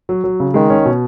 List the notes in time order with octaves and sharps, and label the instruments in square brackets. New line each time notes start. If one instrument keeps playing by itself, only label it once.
[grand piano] F#3
F#3
C#3
[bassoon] D#3 [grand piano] G#3
[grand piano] C#4
B2